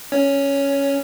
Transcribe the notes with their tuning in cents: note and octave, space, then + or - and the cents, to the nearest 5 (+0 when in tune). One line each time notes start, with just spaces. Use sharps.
C#4 +0 C#5 +10